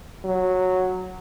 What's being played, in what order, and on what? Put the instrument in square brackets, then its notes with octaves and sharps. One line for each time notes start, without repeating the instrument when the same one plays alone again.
[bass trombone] F#3